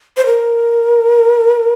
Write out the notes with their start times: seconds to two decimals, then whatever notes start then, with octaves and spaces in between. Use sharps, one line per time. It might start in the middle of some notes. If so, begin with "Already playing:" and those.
0.17 C5
0.26 A#4